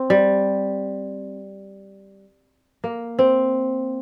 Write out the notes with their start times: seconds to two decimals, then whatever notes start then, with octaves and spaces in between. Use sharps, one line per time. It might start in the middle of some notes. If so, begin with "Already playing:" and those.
Already playing: C4
0.10 G3
2.84 A#3
3.19 C4